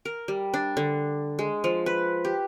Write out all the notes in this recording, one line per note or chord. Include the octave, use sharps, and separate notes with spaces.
A#4
G3
D4
D3
G#3
F3
B4
G4